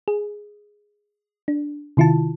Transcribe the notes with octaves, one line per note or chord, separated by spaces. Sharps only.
G#4
D4
C3 D#3 E4 F4 A5